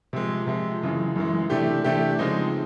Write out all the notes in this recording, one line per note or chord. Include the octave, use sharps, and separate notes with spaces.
C3 F3 G#3
C3 F3 G#3
F#2 C#3 E3 G#3
F#2 C#3 E3 G#3
C3 E3 A3 D4 G4
C3 E3 A3 D4 G4
C#3 F3 G#3 C4 D#4